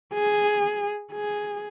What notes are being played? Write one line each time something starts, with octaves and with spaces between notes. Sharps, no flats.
G#4
G#4